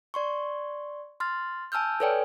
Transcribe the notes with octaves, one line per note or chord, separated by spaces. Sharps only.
D5 C6 C#6
C6 F6 A6
G#5 A5 E6 F6 G6
A4 B4 C#5 D5 G5 G#5